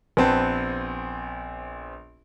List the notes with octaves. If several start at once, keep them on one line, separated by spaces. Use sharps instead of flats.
A#1 B3 C4 B4 A5